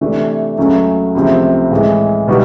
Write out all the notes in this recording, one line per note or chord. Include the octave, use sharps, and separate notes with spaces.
C3 E3 A3 D4
C#2 C#3 F#3 A3 C#4
C#2 C3 F3 A3 C4
A2 E3 G#3
B2 G3 B3 D#4 F#4